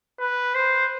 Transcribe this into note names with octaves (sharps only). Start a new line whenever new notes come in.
B4
C5